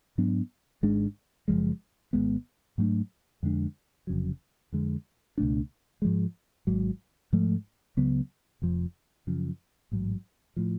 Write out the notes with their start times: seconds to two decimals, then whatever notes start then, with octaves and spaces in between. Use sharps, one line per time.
0.18 G#2 F#3 B3 D4
0.83 G#1 G#2 G#3 D4
1.48 F#1 F2 F3 G#3
2.13 G#1 G#2 G#3 B3
2.78 G#2 F#3 A3 D4
3.43 F2 D3 G#3 D4
4.07 F1 F2 C#3 F#3
4.72 F2 D3 G#3
5.38 C#2 B2 A3 D4
6.02 G#2 F3 G#3
6.67 G#1 G#2 F#3
7.33 G#2 F3 A3
7.97 C#2 C#3 F#3 B3
8.62 F1 F2 F3
9.27 F#2 C#3 F3
9.92 A1 G#2 F#3
10.56 A2 F3